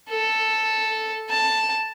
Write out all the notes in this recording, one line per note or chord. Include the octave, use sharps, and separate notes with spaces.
A4
A5